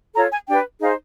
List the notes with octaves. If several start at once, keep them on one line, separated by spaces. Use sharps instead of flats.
F4 A4 C#5 A#5
G#5
D4 G4 B4 G5
D#4 G#4 C5 F5